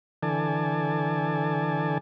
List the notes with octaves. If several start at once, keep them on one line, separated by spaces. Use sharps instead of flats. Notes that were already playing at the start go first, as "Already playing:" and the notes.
D3 E3 A4 D5 G#5 A5